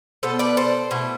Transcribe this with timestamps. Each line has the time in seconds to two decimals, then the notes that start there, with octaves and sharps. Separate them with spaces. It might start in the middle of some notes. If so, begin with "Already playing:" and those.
0.23 B2 B3 D4 A4 C5
0.39 B4 D5
0.57 A4 C5
0.91 B2 A3 E4